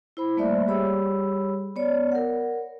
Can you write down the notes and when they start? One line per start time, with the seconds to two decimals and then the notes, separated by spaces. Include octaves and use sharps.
0.17 E4 C5 B5
0.37 G3 A3 A#3 C5 D5 E5
0.68 G3 G4 G#4 C#5 B5 E6
1.76 B3 C#5 D5
2.12 A#4 F#5